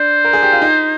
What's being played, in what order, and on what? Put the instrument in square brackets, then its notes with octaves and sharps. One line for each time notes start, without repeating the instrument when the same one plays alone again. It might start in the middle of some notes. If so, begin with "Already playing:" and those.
Already playing: [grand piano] D4 [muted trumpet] C5
[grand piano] A#4
G#4
G4
F4
D#4